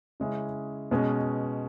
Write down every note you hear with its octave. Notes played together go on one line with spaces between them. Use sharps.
C#3 G#3 C#4 E4 G#4
B2 G#3 C#4